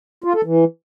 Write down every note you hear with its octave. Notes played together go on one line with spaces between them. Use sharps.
F4
A4
E3